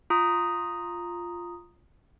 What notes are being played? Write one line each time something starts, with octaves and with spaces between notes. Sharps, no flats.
F4 A#5 D#6